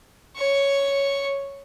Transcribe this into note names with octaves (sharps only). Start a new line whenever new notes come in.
C#5 C#6